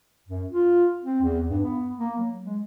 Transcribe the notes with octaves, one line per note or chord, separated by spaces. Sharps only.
F#2
F4
C4
E2
G2
B3
A#3
F#3
G#3